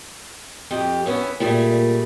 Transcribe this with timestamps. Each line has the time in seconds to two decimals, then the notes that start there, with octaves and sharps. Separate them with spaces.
0.71 F2 G4 D#5
1.06 B3 C#4 E4
1.40 A#2 G3 A3 G#4